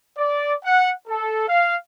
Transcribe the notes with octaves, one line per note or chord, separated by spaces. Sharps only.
D5
F#5
A4
F5